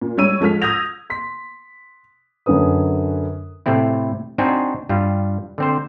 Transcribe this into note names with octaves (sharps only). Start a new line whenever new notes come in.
A#2
G3 G#3 C#5 E6 D#7
F3 G#3 A4 F6 B6
D#6 E6 G6 G#6 A#6 F7
C6 B6
F#2 D3 C#4 B4 D#6
A2 C3 A3 C4 E4
C4 D4 D#4 F#4 C5 G#5
G2 G3 F4
D3 C4 C5